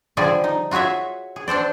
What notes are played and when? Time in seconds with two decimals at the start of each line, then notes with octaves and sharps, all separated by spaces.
0.17 D3 F3 G3 G#4 D5
0.44 D#4
0.71 F4 F#4 G#4 C#5 E5
1.36 G#4
1.48 D4 A4 C5 D5